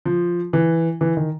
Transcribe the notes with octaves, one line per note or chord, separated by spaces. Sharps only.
F3
E3
E3
D#3